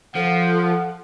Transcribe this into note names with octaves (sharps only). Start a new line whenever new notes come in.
F3 A4 F#5